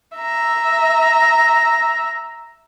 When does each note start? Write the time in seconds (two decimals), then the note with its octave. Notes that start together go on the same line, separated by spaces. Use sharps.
0.16 E5 A#5